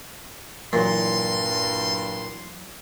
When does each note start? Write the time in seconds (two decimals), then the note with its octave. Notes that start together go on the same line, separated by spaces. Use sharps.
0.73 G2 A#2 E3 F#3 C6